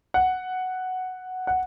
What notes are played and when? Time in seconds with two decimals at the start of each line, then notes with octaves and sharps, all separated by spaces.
0.14 F#5
1.47 F#5